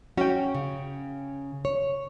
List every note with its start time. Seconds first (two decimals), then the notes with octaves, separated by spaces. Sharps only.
0.17 C#4 F#4 G5
0.55 C#3
1.65 C#5